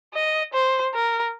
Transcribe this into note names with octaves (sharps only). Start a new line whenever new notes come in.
D#5
C5
A#4